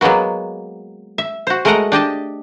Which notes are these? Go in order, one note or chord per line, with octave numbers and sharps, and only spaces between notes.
F#3 G#3 A#3 B3 F#4
E5
F#4 C5
G#3 A3 A#4 D#5 F#5 A#5
D4 G4 D#5 A5